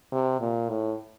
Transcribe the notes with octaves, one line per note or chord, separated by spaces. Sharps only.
C3
A#2
A2